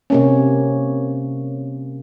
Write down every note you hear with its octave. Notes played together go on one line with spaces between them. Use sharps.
C3 A#3 C#4